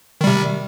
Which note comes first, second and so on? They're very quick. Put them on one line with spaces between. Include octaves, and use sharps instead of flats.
D#3 G3 C3